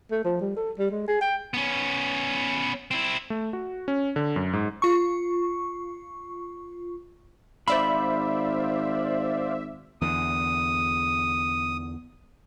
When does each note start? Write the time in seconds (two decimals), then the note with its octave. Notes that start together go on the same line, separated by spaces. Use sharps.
0.11 A3
0.24 F3
0.41 G3
0.57 A4
0.78 G3
0.91 G#3
1.08 G#4
1.21 G5
1.54 B3 C#4
2.91 C4 E4
3.30 A3
3.53 F#4
3.88 C#4
4.16 D3
4.36 F#2
4.53 G#2
4.82 F4 C#6
7.68 G#1 C5 D5 E5 F5 B5
10.01 E2 D3 D#6